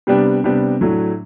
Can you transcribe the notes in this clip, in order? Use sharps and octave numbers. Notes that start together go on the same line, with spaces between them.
C3 G3 B3 D4 G4
C3 G3 B3 D4 G4
A2 F#3 A3 D4